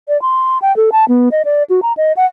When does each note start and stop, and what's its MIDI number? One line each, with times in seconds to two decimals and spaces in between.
0.08 0.20 74
0.22 0.58 84
0.62 0.75 79
0.76 0.90 69
0.92 1.05 81
1.08 1.29 59
1.31 1.42 75
1.45 1.63 74
1.69 1.80 66
1.82 1.93 82
1.97 2.12 75
2.16 2.25 78